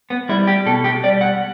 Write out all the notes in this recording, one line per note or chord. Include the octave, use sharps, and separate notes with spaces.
B3
G3 E4
G4
B2 A4
G4
G3 D5
F#5